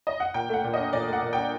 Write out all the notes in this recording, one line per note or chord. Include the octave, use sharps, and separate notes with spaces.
D#5
F#5
A#2 G5
A3 F#5
A#2
D4 D#5
A#2 D5
A3 F#5
A#2
G5
D4